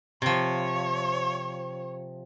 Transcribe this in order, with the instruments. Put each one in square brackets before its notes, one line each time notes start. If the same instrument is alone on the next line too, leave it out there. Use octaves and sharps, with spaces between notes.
[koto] C3 F3 [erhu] C#5